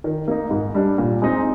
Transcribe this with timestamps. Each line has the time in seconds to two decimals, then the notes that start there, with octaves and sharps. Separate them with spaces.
0.04 D#3
0.28 A#3 D#4
0.50 G#2
0.74 G3 D4
0.98 A#2
1.22 G#3 C4 D#4